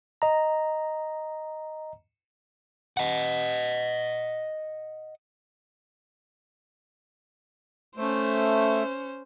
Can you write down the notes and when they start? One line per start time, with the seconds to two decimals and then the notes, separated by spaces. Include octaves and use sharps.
0.22 D#5 A#5
2.97 D#5 F#5
7.97 A3 C#4 C5